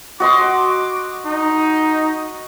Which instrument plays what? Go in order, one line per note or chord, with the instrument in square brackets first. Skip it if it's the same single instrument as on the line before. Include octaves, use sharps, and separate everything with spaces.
[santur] F#4 D#5 C6 [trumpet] D6
[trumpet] D#4